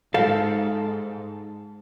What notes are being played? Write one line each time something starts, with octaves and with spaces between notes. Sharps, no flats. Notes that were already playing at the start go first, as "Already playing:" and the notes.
G#2 A4 F5